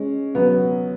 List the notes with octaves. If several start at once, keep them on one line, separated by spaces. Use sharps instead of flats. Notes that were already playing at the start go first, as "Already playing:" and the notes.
Already playing: G#3 C#4
F#3 B3